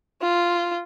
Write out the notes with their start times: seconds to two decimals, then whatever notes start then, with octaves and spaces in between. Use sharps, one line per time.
0.22 F4